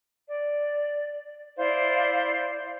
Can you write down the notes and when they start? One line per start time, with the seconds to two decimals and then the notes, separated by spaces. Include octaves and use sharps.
0.29 D5
1.57 E4 C5 D5 F5